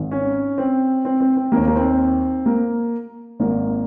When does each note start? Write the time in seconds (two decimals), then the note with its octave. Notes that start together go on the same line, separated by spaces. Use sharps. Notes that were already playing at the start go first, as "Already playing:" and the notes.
Already playing: G#1 G#2 D#3
0.11 C#4
0.58 C4
1.05 C4
1.20 C4
1.36 C4
1.52 D#2 D#3 A#3
1.68 A#3
1.75 C4
2.46 A#3
3.40 G#1 G#2 D#3 A#3